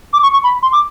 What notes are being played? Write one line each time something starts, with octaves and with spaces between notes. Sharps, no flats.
D6
C#6
C#6
B5
C6
D6